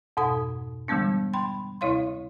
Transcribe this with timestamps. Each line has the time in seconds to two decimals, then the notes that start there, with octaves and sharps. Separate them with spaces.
0.17 F2 G#2 B2 A4 D#6
0.88 D3 E3 G3 G#3 B3 D4
1.34 G5 B5 C6
1.81 D2 C3 E4 C#5 F5 C6